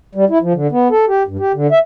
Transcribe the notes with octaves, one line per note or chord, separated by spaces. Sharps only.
G3
E4
F3
D3
B3
A4
G4
G2
G4
D3
E5